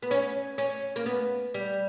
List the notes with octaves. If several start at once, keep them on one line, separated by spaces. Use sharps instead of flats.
B3
C#4
C#4
A#3
B3
G3